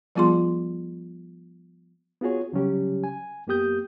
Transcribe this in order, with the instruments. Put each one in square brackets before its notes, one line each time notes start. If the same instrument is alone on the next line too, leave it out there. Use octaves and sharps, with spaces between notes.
[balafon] F3 G3 B3 F4 G#4 C6
[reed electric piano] B3 F4 F#4 G#4 C#5
C2 C#3 F#3 G3 C#4 G4
G#5
F#2 A#3 B3 G4 D#6 G6